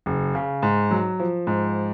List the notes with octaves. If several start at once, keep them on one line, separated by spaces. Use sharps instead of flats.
F#1
C#3
G#2
F#3
F3
G#2